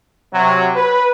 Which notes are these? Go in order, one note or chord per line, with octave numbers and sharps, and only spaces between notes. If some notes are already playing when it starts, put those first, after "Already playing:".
C3 F#3
B4